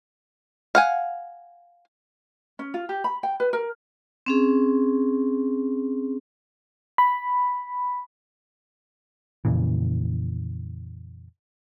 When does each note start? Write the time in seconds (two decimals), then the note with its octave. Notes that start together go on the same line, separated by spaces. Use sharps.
0.75 F5 F#5 G#5
2.59 C#4
2.74 F4
2.89 G4
3.04 B5
3.23 G5
3.40 B4
3.53 A#4
4.26 C4 C#4 G#4
6.98 B5
9.45 F2 A#2 C#3 E3